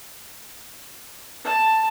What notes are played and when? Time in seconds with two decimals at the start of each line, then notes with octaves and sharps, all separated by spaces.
1.44 A5